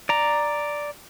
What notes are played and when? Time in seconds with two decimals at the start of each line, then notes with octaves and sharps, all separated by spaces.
0.09 D5 A#5